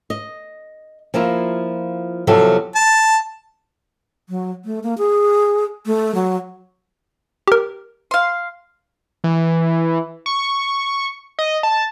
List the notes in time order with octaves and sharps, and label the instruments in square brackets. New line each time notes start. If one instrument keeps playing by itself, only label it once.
[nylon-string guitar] D#5
F3 A#3 E4 F4
E2 C3 F3 F#3 C4 A4
[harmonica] A5
[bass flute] F#3
A3
A#3
G#4
A3
F#3
[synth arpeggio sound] G4 A#4
[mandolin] F5 C6
[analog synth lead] E3
C#6
D#5
A5